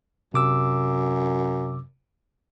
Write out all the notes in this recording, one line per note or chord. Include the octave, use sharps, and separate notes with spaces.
F#2 C3 D6 E6